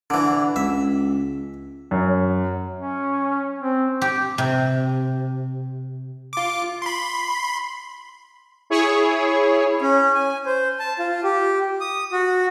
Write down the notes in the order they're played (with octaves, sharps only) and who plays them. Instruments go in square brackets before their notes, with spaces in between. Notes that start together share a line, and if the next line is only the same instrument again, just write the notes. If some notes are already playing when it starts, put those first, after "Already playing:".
[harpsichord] D3 E3
[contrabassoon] C#2 [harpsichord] E5
[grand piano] F#2
[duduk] C#4
C4
[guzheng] G4
C3
[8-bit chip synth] F4 D6
B5 C6
[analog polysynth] E4 G#4 C#5
[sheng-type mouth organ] C#4
G#5
C5
A5
F4
G4
D#6
F#4